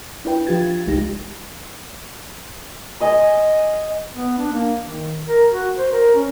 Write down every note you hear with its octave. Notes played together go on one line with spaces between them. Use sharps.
D4 E4 B4 G5
F3 F4 G4 G#6 A6
G1 C2 G#3 D#4 G4 A#6
G#4 D#5 C6
B3
D4
A#3
D#3
A#4
F#4
C5
A#4
C#4